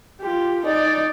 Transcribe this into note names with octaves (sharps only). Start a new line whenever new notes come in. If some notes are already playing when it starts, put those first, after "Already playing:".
F4 G4
D#4 D5